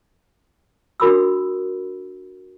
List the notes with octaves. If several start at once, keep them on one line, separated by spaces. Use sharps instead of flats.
D4 F#4 A#4 B5 D#6 E6